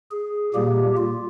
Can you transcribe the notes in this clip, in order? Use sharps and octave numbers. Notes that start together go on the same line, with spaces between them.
G#4
A#2 G3 A#3 G4
F4